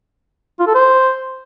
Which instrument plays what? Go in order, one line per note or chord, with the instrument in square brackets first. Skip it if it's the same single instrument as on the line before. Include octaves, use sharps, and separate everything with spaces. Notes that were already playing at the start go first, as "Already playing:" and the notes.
[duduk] F4
A4
C5